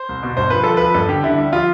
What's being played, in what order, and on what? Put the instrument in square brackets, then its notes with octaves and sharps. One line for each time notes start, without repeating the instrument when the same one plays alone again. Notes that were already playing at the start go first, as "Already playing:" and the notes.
Already playing: [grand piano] C5
C2
B2
G2 C5
F3 B4
F3 A4
F3 B4
G2 A4
D3 G4
D3 E4
G3
F3 F4